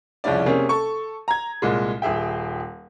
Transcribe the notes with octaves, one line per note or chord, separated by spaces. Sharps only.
C2 F2 C#3 C#4 E4 D5
C3 A#3 C#4 G#4
A4 C#6
A#5 G#6
C2 A#2 G#3
D#1 G#4 E5 G5